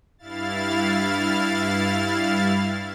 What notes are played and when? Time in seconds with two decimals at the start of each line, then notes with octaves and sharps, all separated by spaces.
0.18 G2 E4 F5 A6